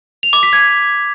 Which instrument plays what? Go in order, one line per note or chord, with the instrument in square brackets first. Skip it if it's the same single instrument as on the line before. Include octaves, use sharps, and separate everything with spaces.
[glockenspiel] F7
D6
B6
G#6